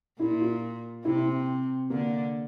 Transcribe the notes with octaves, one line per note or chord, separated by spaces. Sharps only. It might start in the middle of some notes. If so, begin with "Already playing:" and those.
A#2 E4
F4
C3 E4
C4
D3 A#3